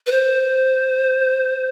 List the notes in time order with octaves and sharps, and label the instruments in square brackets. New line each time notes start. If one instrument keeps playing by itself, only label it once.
[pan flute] B4
C5